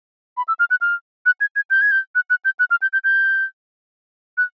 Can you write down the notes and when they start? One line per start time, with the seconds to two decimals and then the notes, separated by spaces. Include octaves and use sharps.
0.37 B5
0.48 E6
0.59 F6
0.70 F#6
0.81 F6
1.26 F#6
1.41 G#6
1.56 G#6
1.70 G6
1.81 G#6
1.91 G6
2.15 F#6
2.30 F#6
2.45 G6
2.59 F#6
2.71 F6
2.82 G6
2.93 G6
3.04 G6
4.38 F#6